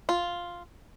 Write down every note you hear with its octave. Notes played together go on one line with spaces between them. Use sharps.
F4